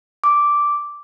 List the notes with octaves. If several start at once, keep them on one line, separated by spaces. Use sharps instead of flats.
D6